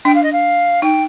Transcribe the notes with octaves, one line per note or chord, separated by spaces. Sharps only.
D4 G5
F5
D#5
F5
D#4 G5